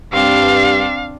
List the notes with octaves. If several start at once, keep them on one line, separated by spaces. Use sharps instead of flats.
G2 C4 D4 F5